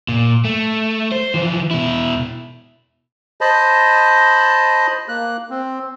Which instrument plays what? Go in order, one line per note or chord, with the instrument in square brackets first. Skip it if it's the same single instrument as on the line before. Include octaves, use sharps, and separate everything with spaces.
[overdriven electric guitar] A#2
A3
C5
E3 F3
B2 E4
[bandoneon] C5 D#5 A5 B5
A#3 F#6
C4